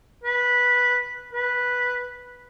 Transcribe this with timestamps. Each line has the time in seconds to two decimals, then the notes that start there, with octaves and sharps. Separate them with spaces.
0.24 B4
1.33 B4